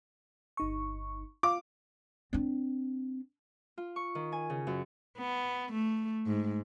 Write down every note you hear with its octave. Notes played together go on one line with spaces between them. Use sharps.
G1 D#4 C#6
F4 F5 D6
C4 D4
F4
C#6
D#3
G#5
C#3
F#2
B3
A3
G#2